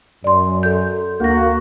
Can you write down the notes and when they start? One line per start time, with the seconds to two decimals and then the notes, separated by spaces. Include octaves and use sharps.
0.24 F#2 D5 C6
0.63 A4 G6
1.20 D2 A#3 F#4 A#6